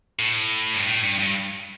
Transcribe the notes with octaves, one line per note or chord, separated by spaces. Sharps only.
A2
G2
A2
G2
G2